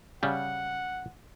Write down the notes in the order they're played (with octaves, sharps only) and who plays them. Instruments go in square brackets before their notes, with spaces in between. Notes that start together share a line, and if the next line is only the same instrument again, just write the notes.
[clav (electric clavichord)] C#3 G3 [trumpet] F#5